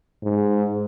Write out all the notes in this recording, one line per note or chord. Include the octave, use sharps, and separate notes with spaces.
G#2